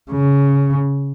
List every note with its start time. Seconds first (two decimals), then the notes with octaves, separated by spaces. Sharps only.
0.11 C#3